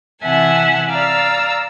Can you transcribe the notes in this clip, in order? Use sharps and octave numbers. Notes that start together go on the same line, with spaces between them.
C3 E3 E5 F#5 G#5 A5
D5 F5 A#5 E6